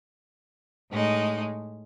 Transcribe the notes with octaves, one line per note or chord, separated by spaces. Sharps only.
A2 G#3 D#4